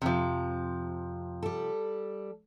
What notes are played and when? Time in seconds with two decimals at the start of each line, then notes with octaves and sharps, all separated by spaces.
0.02 F2 C3 F3
1.43 G3 A4